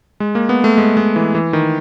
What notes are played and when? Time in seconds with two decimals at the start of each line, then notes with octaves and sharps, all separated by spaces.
0.20 G#3
0.35 A#3
0.49 B3
0.64 A3
0.78 G#3
0.97 G#3
1.16 E3
1.35 E3
1.53 D#3